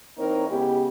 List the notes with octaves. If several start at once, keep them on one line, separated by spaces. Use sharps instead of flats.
E3 A#3 C4 D#4 A#4 C#5
C#3 G#3 B3 E4 G4